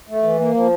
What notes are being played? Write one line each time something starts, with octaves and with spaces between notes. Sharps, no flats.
A3
E3
A#3
F3